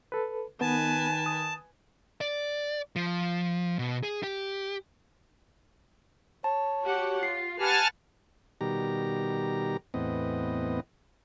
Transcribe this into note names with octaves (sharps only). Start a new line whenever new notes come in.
A4 B4
D#3 B3 B4 G#5 A5
D#6
D5
F3
B2
G#4
G4
C#5 A5
F#4 G4 F#5
F4 C7
G4 B4 F#5 G#5 A5 F6
B2 D#3 G3 G4 A#5
E2 A2 B3 C4 D#5